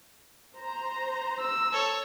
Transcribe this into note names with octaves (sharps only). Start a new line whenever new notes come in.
C5 A#5
E6
A4 C#5